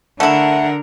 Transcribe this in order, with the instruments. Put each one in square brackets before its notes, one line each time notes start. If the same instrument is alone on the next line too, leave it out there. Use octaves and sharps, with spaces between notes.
[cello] D3 A#4 [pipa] A3 E4 [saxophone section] F#5